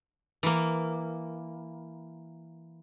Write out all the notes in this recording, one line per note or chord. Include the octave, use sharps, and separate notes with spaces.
E3 A#3